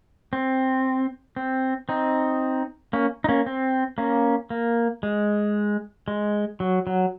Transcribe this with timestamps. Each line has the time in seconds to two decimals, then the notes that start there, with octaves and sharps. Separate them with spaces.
0.33 C4
1.36 C4
1.89 C4 D#4
2.93 A#3 C#4
3.24 D#4
3.29 A#3 C#4
3.46 C4
3.98 A#3 C#4
4.50 A#3
5.03 G#3
6.08 G#3
6.60 F#3
6.87 F#3